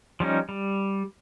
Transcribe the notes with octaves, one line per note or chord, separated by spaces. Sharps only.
F3 G3 C#4 D#4
G3